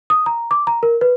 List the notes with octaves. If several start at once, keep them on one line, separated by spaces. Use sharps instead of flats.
D#6
A#5
D6
A#5
A#4
B4